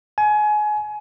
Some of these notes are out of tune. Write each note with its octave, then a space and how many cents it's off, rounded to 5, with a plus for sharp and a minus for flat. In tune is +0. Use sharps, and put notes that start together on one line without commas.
G#5 +25